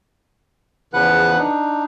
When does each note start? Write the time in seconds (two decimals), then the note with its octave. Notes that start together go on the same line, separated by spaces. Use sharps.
0.94 E2 C#3 F3 B4 F#5 F#6
1.38 D4 D#4